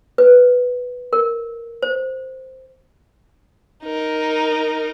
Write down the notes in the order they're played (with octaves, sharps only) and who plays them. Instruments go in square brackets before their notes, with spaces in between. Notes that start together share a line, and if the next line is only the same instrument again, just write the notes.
[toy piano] B4
A#4
C5
[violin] D#4 A#4